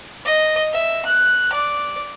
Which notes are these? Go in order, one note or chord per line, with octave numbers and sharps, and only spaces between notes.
D#5
E5
F#6
D5